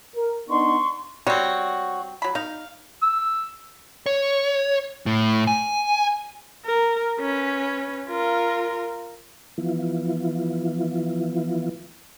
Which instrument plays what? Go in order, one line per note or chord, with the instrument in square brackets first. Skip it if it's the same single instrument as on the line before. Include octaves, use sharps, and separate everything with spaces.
[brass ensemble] A#4
[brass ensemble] B3 D4 D#4 [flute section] C6 C#6
[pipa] G3 C4 [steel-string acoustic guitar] F#4 C#5
[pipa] F#3 B5
[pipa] D#4 [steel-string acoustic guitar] F5
[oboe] E6
[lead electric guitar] C#5
A2
G#5
[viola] A#4
C#4 B4
F4 A#4
[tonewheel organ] E3 F3 B3 E4 F4